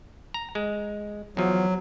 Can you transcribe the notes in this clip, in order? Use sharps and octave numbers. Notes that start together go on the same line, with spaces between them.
A#5
G#3
E2 F3 F#3